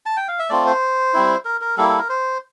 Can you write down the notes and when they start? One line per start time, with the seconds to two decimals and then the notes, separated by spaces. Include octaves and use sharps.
0.06 A5
0.17 G5
0.28 F5
0.39 E5
0.50 A3 C4 F4 D5
0.66 C5
1.14 G3 C4 E4
1.45 A#4
1.61 A#4
1.77 G3 A#3 E4 A4
1.89 A4
1.98 A#4
2.09 C5